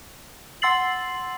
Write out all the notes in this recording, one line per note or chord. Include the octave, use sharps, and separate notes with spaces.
F#5 C6 E6 A6 C7 F#7